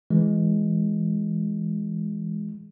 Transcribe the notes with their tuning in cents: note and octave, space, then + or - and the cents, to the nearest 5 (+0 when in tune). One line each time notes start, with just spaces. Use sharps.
E3 +0 G#3 +0